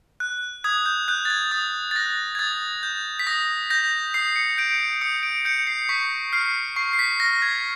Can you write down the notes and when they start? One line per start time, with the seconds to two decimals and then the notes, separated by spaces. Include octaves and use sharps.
0.20 F#6
0.64 D#6 G#6
0.86 G6
1.08 F#6 G6
1.25 A6
1.30 G#6
1.52 D#6 A6
1.91 A6
1.95 F#6 A#6
2.35 G#6
2.39 D#6 A6
2.83 G6
3.19 B6
3.27 D#6 A#6
3.70 G6 A#6
4.14 D#6 C7
4.36 C#7
4.58 G6 D7
4.79 C#7
5.01 D#6 C#7
5.23 D7
5.45 G6 C#7
5.67 C7
5.89 C#6 B6
6.33 F6 C7
6.76 C#6 C7
6.93 C7
6.99 B6
7.20 F6 A#6
7.42 G#6